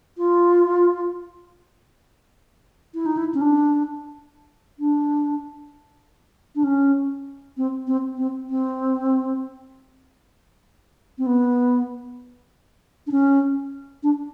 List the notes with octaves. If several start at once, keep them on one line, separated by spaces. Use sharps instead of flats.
F4
E4
D#4
E4
C#4
D4
D4
D4
C#4
C4
C4
C4
C4
C4
B3
D4
C#4
D4